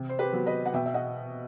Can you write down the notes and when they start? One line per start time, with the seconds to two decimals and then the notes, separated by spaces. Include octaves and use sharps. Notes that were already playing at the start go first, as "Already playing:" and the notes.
Already playing: C3
0.09 C5
0.18 G4 B4
0.33 F#3 B3
0.46 B4 D#5
0.66 F#5
0.74 B2 E5 G5
0.86 E5
0.94 D#5 F#5